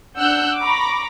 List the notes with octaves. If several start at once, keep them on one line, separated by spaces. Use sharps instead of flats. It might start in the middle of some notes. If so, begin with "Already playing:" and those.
D4 F#5 E6 F#6 G6
A#5 B5 C#6 D6